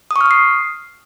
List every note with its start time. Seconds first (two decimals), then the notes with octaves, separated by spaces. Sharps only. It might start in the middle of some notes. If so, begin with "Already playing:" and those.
0.11 D#6
0.16 C#6
0.21 F6
0.26 D#6
0.31 C7